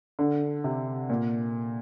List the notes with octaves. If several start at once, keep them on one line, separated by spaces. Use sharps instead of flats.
D3
C3
A#2